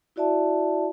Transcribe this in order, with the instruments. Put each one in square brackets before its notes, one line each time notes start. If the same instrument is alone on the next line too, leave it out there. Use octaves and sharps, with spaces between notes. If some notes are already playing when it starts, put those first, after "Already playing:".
[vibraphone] E4 F#4 D5 E5 A5